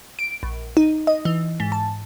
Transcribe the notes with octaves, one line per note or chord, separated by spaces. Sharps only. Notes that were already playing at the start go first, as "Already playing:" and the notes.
D7
A#1
D#4
D#5
E3
G#2
A5